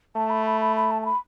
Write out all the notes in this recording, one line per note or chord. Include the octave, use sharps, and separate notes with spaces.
A3 A5
B5
B5
B5
B5
A5
A5
B5